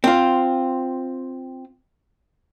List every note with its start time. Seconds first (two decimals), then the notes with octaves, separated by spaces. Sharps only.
0.04 C4 F4